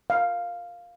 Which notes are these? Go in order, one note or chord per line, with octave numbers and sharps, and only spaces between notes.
F5